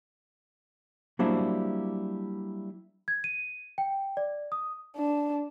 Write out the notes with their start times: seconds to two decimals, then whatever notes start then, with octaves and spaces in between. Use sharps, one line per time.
1.19 F#3 G3 A#3 D4 E4 C5
3.08 G#6
3.24 D#7
3.78 G5
4.17 D5
4.52 D#6
4.97 D4